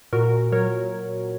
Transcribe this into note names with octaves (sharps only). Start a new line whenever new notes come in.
A#2 F#4 A#4
F#3 A#4 C#5